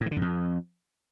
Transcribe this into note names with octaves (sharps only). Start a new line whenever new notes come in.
A2
E3
D3
F#2
F2